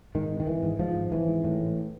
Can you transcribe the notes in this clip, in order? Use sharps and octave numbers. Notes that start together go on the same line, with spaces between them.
G#2 D#3
G#1
D#3
G#1 E3
G#2
G#2 F3
G#1
G#1 E3
G#2
A2
A1